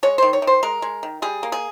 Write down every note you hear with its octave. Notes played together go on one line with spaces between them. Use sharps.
G#3 C#5
D#3 C5
C#5
D#3
C5
G#3 A#4
G#3
D#3
G3 G#4
A#3
G#4